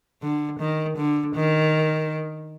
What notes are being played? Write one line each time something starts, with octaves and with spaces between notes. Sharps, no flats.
D3
D#3
D3
D#3